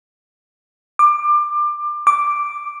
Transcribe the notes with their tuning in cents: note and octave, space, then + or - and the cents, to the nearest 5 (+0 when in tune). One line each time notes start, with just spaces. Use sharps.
D6 +25
D6 +0